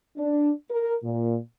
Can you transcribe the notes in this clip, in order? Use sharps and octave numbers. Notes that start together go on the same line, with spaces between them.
D4
A#4
A#2